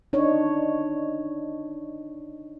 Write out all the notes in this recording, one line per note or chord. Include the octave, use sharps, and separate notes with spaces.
D4 D#4 C#5